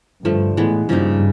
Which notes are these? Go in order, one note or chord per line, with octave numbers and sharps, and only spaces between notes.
G2 D3 F3 A3
A2 E3 G#3 B3
G2 C#3 F3 A#3 D#4